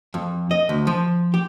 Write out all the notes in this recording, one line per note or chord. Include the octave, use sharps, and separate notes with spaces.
F2
D#5
D2
F3
G4